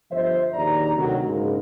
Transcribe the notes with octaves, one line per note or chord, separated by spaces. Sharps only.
G1 F3 C5 D#5 E5
A#1 D#2 D5 A#5
D2 C3 D#3 F#3
A#1 G#2 C#3 G#3 A#4